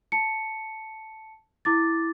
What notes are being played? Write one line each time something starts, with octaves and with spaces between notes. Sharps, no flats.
A5 C#7
E4 D6 A6